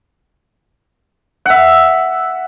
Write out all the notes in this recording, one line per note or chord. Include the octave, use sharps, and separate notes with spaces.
E5 F#5